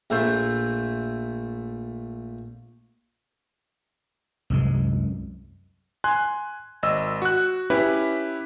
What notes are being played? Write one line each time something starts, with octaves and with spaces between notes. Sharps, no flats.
A#1 A3 C5
C2 F#2 G#3
G#5 C6 F#6
G#1 D#5 E6
F#4 F#6
C#4 E4 G4 B4